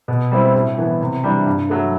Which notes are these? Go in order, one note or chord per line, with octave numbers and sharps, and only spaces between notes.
B2
G3 C4 E4
A2
E3 B3
C3
E3 G3 D4
G2
F#3 A3